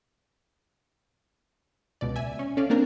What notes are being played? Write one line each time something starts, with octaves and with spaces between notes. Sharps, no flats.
C#2 B2 D5
E5 G#5
C#4
C#4 A4 D5 F5
A#3 C4 D4 A#4